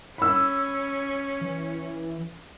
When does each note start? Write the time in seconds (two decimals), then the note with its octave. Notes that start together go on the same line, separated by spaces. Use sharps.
0.18 C#4 B5 E6
1.41 E3